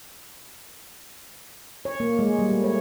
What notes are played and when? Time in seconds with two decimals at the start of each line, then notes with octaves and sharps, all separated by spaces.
1.85 C#5
2.00 A#3
2.19 G#3
2.39 G3
2.52 A3
2.64 C#5